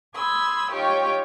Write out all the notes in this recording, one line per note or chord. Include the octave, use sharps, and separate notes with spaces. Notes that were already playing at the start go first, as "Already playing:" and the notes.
B5 C6 D#6 E6 G#6
D#4 F4 G4 C#5 G5 C#6